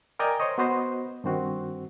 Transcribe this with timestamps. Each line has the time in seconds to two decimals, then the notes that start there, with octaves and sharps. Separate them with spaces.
0.19 A#4 D5 D#5 G5 G#5 A#5
0.40 C5 C#5 D#5
0.58 B3 F#4 B4 C5 D#5
1.24 G2 D#3 C4 F#4